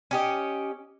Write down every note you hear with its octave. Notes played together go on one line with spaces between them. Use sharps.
C#4 G4 D#5